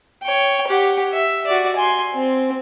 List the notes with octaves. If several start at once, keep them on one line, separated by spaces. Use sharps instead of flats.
C#5 G5
G4 F#5
E5
F#4 D5
G#5 C6
C4